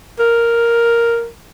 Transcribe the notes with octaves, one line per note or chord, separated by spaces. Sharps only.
A#4